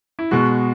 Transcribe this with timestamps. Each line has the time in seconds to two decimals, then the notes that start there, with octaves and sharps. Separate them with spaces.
0.19 E4
0.31 B2 G#3 F#4